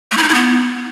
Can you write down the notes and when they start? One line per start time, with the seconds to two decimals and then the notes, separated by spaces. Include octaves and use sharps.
0.12 A3
0.17 E4
0.23 D#4
0.29 E4
0.34 B3